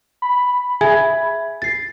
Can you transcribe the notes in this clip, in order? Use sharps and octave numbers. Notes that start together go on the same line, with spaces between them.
B5
G#4 E5 G#5 G#6
A6 C7